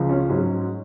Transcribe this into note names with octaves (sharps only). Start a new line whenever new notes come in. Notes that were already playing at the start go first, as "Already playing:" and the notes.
Already playing: C#2 C#3 F3
C#4 F4
G#2 F#3 C#4